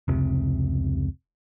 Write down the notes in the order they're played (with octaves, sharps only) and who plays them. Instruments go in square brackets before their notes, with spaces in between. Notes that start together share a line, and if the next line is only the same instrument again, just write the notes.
[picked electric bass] F1 C#2 C3